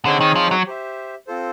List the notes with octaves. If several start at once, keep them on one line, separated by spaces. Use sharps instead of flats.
D3 C4 D#4 G#4 C#5
D#3
F3
F#3
G4 C5 E5
C4 F4 A4 C5